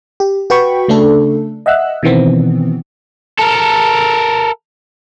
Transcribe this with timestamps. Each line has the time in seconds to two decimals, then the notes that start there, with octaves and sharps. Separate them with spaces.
0.20 G4
0.50 F#4 B4 G5 B5 C#6
0.88 C#3 A3 D4 A4
1.66 D#5 E5 F#5 E6 F#6
2.03 B2 D#3 E3 B3 C4
3.39 A4 A#4